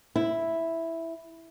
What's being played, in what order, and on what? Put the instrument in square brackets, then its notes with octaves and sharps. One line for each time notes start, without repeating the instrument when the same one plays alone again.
[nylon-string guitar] E4